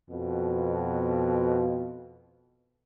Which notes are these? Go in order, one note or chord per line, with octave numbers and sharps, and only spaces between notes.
F2 B2